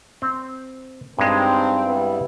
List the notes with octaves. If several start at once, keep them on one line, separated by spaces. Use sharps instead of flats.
C4
G2 G#3 C4 D#4 G4
G3 B3 E4